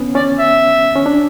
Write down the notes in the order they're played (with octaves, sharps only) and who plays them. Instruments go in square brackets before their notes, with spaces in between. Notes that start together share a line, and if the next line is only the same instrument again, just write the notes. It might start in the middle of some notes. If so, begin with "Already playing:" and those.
Already playing: [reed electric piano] B3 C#4
[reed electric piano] C#4 [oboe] D5
[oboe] E5
[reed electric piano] C#4
D4